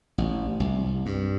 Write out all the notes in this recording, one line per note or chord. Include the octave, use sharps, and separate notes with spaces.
A1
C2
G2